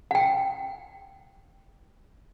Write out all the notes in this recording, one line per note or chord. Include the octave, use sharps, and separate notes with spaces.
F#5 G5